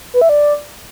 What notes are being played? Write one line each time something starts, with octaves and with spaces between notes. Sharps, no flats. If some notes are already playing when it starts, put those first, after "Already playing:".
B4
E5
D5